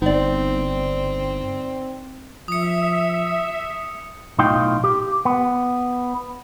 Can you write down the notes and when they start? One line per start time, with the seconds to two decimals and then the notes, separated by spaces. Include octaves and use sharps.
0.02 G1 C4 D#4 D5
2.48 F3 E5 D#6 C#7
4.39 B1 A2 D#4 F4 F5 G5
4.84 G4
5.25 B3